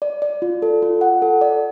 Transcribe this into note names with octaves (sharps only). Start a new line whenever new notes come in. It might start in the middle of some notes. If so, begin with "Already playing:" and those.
D5
D5
F4
A4
F4
F#5
A4
D5